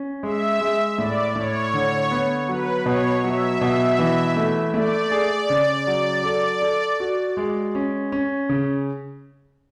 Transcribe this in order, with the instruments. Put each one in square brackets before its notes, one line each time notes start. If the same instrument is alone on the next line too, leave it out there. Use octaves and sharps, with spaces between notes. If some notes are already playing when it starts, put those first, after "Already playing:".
Already playing: [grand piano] C#4
[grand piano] G#3 [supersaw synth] E5
[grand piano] G#3
[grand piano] A2 [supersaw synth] D5
[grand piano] A2 [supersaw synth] C#5
[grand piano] D3
B3
[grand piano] F#3 [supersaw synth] B4
[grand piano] B2 [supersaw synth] C#5
[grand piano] F#3 [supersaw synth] E5
[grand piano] B2
E3
A3
[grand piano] A3 [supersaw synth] D5
[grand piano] G#4
C#3
F#3
A4
A4
F#4
G#3
C#4
C#4
C#3